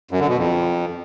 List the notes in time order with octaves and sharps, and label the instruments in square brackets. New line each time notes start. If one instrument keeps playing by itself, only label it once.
[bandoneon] F#2
D3
B2
F2